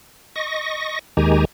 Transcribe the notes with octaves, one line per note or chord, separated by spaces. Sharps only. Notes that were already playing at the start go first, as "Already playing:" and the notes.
D#5 C#6 A#6
D#2 D#3 G#3 G4 G#5 A#5